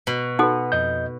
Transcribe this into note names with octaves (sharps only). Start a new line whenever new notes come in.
B2
D#4 F#4 A4 B4 F#5
F2 D#5 G6